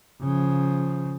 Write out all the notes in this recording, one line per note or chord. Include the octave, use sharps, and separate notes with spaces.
C#3 F3